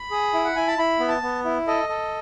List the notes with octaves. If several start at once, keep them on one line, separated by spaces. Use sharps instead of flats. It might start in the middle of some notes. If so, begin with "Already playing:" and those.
Already playing: B5
G#4
E4
F#5
E4 G#5
A5
E4 B5
B3
A5
B3
E4
A4 D#5
A4